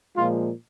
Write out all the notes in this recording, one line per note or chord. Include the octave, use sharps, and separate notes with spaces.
A#2 F3 G#3 F4